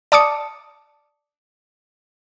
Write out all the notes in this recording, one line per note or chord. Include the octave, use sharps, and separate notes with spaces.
D5 A5 D6 D#6 C#7